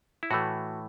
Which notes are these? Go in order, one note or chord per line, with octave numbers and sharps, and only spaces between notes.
E4
A2 E3 A3 F#4